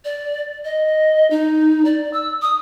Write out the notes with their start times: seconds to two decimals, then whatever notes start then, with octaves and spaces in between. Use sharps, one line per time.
0.05 D5
0.65 D#5
1.31 D#4
1.85 D5
2.13 E6
2.42 D#6